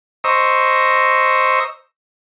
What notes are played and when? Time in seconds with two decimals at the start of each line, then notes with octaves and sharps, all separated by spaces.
0.24 C5 D#5 A#5 C#6 E6